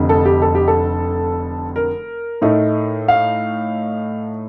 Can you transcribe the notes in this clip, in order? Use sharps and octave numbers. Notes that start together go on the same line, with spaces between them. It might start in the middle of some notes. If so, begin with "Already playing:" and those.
Already playing: F1 F2 D3
A4
G4
A4
G4
A4
A#4
A2 A3 D#4
F5